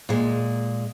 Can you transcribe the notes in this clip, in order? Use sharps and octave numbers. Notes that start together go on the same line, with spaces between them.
A#2 G#3